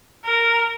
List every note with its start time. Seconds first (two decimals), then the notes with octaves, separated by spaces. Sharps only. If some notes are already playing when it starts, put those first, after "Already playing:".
0.25 A#4